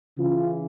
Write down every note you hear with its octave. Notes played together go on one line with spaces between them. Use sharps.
C#3 E3 F4